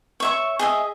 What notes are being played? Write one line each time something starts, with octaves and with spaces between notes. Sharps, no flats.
C#5 E5 C#6
G#4 D#5 E5